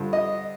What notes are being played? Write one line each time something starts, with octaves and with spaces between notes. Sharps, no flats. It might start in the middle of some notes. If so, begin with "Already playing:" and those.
Already playing: G2 D3 F3
D#5